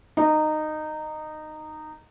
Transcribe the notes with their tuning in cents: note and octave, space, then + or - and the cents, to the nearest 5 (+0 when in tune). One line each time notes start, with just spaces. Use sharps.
D#4 -15